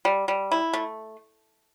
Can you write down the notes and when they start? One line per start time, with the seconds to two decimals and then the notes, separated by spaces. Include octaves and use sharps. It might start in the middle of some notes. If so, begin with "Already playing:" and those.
0.05 G3
0.28 G3
0.52 E4
0.73 A3